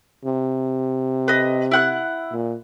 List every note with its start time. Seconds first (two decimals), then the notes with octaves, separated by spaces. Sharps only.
0.25 C3
1.28 B4 D#5
1.71 E4 F#5 F#6
2.32 A#2